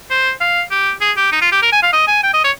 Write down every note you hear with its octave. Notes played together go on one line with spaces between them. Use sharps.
C5
F5
G4
G#4
G4
D#4
F4
G4
A#4
G#5
F5
D#5
G#5
G5
D#5
C#5